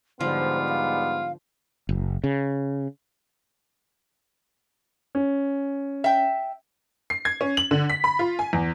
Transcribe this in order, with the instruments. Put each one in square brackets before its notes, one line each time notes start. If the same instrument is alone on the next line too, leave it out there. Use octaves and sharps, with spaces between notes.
[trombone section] G#2 G3 B3 [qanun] D3 F3 [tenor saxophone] F4 [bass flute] C5
[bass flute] F5
[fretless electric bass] F#1
C#3
[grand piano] C#4
[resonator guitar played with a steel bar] E5 G5
[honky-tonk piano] C7
G#6
C#4
F#7
D3
B6
B5
F4
G#5
E2